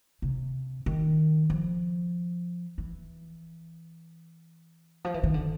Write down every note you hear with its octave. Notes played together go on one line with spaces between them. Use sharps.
C3
D#3
F3
E3
F3
E3
D#3
D3